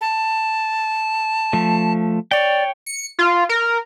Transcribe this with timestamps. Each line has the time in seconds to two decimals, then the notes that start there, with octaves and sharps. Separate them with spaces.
0.01 A5
1.53 F3 A3
2.31 C#5 D5 G5
2.86 C#7
3.19 F4
3.49 A#4